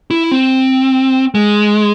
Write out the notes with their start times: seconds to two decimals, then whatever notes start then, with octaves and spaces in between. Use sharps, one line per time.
0.11 E4
0.31 C4
1.35 G#3